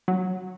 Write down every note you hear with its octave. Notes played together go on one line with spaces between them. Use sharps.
F#3